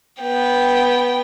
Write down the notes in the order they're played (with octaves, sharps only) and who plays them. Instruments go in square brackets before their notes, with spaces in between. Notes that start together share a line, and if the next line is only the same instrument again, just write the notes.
[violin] B3 G5